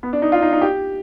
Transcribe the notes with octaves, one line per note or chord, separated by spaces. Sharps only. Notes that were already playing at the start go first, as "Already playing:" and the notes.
B3
D4
D#4
F4
D#4
D#4
G4